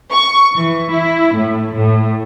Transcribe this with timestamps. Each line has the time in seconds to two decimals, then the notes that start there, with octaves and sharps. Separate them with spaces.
0.11 C#6
0.56 E3
0.92 E4
1.39 A2
1.77 A2